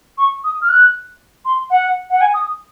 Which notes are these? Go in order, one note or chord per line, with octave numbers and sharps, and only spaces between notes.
C#6
D#6
F6
F#6
C6
F#5
F#5
G#5
D#6